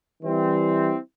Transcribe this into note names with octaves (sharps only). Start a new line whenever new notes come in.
E3 G3 C4 E4